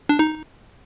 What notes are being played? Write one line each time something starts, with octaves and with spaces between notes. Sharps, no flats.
D4
D#4